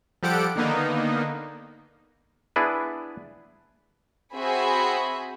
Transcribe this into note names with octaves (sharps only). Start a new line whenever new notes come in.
F3 G3 G4 A4 F#5 D7
D3 D#3 A#3 B3 D#4
B3 D4 E4 G#4 B4
C4 F#4 G#4 E5 B5